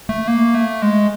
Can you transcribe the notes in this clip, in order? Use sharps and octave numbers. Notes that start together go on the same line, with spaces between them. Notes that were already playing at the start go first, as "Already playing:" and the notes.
A3
A#3
A3
G#3